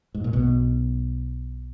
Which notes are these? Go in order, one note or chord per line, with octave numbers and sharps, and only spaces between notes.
G#2
A#2
B1 B2